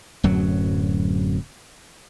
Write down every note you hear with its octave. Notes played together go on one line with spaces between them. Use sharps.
D1 F#2 F#3